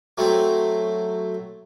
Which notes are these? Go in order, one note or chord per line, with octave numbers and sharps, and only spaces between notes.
F#3 A3 C4